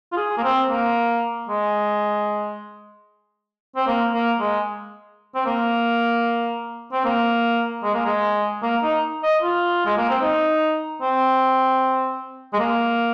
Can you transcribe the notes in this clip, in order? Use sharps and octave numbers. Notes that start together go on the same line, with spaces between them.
F4
G#4
A#3
C4
A#3
G#3
C4
A#3
A#3
G#3
C4
A#3
C4
A#3
G#3
A#3
G#3
A#3
D#4
D#5
F4
G#3
A#3
C4
D#4
C4
G#3
A#3